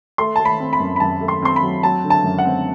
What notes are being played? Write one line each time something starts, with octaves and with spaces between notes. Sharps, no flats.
A3 C6
A3 A5
B5
C4
B5
F#2
B5
F#2 A5
A3
C6
C4 C6
B5
F#3
F#3 A5
D3
A5
F#2
F#5
C4